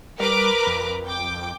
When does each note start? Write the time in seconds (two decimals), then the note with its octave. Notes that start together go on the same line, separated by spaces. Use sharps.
0.20 G3 A#4 B4 D6
0.66 F2
1.06 G5 D6